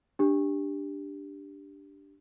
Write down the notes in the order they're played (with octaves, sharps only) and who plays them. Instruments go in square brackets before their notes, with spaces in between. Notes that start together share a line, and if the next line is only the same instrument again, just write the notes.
[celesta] D4 G4